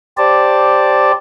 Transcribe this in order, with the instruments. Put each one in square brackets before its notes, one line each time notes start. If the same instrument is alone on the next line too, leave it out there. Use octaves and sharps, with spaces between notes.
[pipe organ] G4 C5 D5 A5